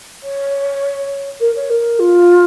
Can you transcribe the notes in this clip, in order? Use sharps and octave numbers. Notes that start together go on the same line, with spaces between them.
C#5
A#4
C#5
A#4
F4